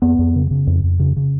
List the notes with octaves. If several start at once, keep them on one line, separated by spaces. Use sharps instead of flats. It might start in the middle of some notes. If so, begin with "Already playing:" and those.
F2 B3
F2
C#3
C#3
F2
F2
C#3
C#3